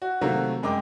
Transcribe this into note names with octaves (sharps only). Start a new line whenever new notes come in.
F#4
C3 D#3 F#3 A3 A#3 F#4
F#2 G#3 A#4 G5 D6